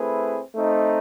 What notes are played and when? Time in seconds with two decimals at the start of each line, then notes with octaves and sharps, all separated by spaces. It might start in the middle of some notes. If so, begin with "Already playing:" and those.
Already playing: A3 C4 E4 G#4 B4
0.55 A3 C4 D#4